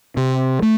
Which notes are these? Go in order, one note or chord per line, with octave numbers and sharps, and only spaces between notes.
C3
A3